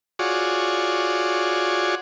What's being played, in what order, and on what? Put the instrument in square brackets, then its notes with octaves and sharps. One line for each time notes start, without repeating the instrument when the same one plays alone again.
[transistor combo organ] F4 F#4 G#4 C#5 D5